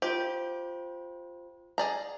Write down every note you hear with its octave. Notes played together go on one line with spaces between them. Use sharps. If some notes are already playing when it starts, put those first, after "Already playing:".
F4 G4 C5
G#4 D5 A#5